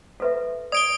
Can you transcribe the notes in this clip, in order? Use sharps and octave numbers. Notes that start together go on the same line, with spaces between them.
A4 B4 E5
D5 D#6 D7 G7